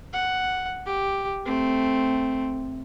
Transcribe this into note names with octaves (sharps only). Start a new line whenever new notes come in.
F#5
G4
A3 C4